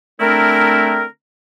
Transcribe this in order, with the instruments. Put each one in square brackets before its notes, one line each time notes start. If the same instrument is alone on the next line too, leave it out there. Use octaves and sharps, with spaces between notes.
[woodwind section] D3 A3 C4 D4 E4 A#4